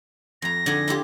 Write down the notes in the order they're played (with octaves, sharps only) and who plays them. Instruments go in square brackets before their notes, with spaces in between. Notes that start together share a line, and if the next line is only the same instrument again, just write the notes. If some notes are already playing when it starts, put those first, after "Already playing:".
[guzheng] F2 A#5 [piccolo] A#6
[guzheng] D3 D4 G#4
E4 F4 G4